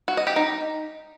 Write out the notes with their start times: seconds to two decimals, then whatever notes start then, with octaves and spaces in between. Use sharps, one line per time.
0.08 F#4
0.17 D#5
0.27 G4
0.36 D#4